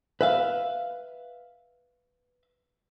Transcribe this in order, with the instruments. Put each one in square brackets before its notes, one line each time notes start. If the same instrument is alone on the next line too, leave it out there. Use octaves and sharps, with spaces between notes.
[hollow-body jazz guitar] B4 E5 F5